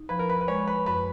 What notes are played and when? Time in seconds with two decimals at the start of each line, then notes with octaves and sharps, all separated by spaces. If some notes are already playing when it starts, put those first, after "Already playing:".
Already playing: D#4
0.09 F3 B4
0.19 A#4
0.30 B4
0.41 B4
0.48 G#3 C#5
0.67 B4
0.86 F#2 B4